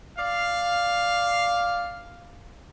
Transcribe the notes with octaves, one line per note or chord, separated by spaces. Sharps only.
D5 F5